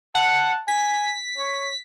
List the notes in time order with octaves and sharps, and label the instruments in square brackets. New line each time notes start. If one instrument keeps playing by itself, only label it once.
[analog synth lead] F#5 [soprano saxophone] A5
[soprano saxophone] G#5 [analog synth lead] B6
[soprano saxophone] C#5